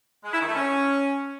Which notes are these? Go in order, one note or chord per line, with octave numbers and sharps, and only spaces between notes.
G#3
E4
D#3
A3
C#4